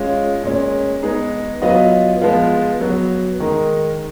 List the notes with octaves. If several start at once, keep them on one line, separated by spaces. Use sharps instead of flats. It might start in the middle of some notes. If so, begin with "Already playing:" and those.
Already playing: G#3 C#4 F4
A#2 G#3 C#4
G#3 B3 D#4 G#4
F#3 B3 F4 B4 D#5
F3 G#3 B3 F4
F#3 B3 F#4
D#3 G#3 D#4 A#4